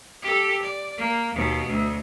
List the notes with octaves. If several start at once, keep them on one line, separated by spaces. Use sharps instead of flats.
G4 A4
D5
A#3
D#2 B2
D2